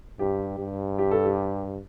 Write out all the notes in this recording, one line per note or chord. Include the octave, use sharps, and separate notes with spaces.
G2 G4
G2
G4
A4
G4